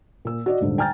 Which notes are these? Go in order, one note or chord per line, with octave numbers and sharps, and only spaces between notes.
A#2 E6
F#4 D5 D#5
D#1 G#1 D3
G5 G#5 A#5 F6 G6 A6